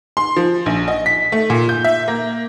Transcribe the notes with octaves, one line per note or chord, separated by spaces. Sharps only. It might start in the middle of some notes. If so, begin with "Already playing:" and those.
C6
F3
A#1
D#5
B6
A3
A#2
G6
E5
A#3